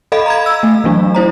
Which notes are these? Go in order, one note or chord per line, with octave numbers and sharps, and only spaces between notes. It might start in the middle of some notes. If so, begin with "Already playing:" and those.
A4 D#5 F5 B5
A#5 B5 G#6
E6
A3
E3 F#3 A3 D4
E4 C5 A#5